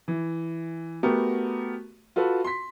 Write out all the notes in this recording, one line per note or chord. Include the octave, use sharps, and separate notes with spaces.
E3
A3 B3 F#4 G4 A#4
F4 F#4 A4 B4
C6 B6